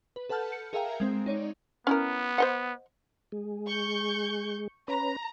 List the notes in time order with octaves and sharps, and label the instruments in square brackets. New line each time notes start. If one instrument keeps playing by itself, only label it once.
[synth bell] B4
A4 B4 F#5 A5 F6 G6
C#7
G#4 A#4 E5 F5 G5 A#5
G#3 C4
D#4 C#5 D5
[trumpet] B3 [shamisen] C#4 E4 A#4
[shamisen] C5 D#5 F#5
[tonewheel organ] G#3
[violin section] C#6 G6
[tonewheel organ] C#4 B4 [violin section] A#5